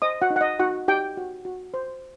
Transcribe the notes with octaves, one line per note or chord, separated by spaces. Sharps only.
C5 D#5 D#6
F#4 F#5
D#4
F#5
D#5
D#4 F#4 F#5
D#4 G4 G5
F#4
F#4
C5